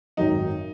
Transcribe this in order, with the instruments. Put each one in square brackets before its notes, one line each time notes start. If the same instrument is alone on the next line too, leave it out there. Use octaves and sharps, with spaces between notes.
[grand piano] G#1 F#2 D#3 F#3 [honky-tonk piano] D#4